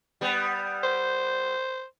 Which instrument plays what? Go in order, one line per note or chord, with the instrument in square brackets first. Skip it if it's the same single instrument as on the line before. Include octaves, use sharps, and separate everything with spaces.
[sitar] G3 B3
[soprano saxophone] C5